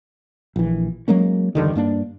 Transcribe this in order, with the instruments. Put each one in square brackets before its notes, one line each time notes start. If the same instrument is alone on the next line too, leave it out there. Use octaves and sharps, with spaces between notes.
[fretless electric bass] A#1 E3
F#3 G#3 A#3 C#4
E2 G2 D3 D#3
G2 A#3 D4